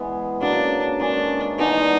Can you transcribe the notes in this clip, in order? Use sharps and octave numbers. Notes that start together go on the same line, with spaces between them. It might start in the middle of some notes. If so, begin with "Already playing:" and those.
Already playing: E3 G#3 B3
C#3 F#3 A#3 D4
D#3 G#3 C#4 D4
E3 G#3 B3 D4 D#4